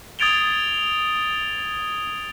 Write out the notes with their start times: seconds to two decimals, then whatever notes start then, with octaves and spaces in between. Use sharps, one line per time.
0.19 D#6 G#6 A6 D7 F7 G7